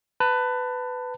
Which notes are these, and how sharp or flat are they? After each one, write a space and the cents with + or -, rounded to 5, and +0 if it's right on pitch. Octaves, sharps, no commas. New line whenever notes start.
B4 +15 A5 +25